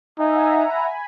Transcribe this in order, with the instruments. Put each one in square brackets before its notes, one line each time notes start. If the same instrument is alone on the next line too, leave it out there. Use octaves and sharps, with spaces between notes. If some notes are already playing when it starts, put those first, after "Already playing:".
[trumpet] D#4 [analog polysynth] E5 G#5
[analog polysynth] F#5 A#5
F#5 A#5
G#5 B5
G#5 B5